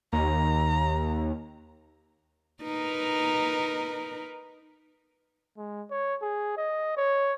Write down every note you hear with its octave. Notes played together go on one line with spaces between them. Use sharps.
D#2 A#5
D#4 A#4 B4
G#3
C#5
G#4
D#5
C#5